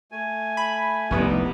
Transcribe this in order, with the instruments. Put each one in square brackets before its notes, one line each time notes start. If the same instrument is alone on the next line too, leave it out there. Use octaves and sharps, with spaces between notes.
[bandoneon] A3 G#5
[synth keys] B5
[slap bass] F1 [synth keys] C2 B3 [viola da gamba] G3 D#4 E4